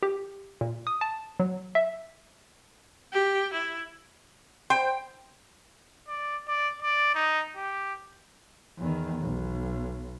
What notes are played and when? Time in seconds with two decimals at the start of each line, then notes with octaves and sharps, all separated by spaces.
0.03 G4
0.61 A#2
0.87 D#6
1.01 A5
1.40 F#3
1.75 E5
3.13 G4
3.53 E4
4.70 C5 G5
6.08 D5
6.48 D5
6.82 D5
7.15 D#4
7.56 G4
8.78 E2 D#3
9.22 B1